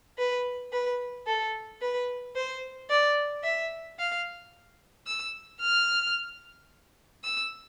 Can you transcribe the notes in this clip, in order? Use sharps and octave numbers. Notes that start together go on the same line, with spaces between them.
B4
B4
A4
B4
C5
D5
E5
F5
E6
F6
E6